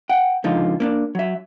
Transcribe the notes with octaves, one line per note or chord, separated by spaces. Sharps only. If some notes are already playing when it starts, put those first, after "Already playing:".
F#5 G5
C#2 D3 F3 D#4 F4
A#3 C#4 D4
F#3 E5